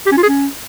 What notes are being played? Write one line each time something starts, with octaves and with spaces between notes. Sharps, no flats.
G4
C#4
F4
G#4
C#4